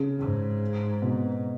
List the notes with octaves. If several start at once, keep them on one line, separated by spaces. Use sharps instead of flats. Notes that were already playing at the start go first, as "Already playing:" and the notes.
Already playing: C#3
G#2
B2